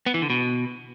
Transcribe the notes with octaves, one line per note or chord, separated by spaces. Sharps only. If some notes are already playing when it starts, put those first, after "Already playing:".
B3
E3
D3
B2